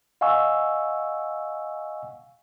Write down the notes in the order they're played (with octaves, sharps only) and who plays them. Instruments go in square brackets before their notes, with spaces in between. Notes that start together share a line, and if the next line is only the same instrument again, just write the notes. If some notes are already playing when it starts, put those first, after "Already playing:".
[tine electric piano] D#5 F5 F#5 G#5 C#6 E6